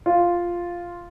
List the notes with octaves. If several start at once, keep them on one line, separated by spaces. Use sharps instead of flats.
F4